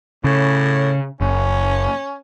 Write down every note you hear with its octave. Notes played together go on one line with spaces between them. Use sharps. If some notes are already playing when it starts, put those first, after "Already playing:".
A2 C#3
F#1 C#4